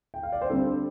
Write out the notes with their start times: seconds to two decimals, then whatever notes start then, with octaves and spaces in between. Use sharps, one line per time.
0.14 G5
0.23 F5
0.32 D5
0.42 C5
0.50 D3 G3 C4 A4